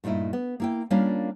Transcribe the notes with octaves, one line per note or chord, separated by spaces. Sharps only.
G2 A#2 A3 D#4 E4
B3
A#3 E4 G5
G3 A#3 C#4 D4 F4